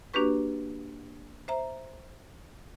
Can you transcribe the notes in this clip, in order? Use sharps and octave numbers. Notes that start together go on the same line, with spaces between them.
A#3 D4 F#4 G4 B4 C#6
C5 E5 A#5